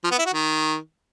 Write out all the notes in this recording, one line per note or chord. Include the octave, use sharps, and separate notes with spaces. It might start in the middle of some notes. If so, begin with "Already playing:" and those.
F3
B3
E4
F#4
D#3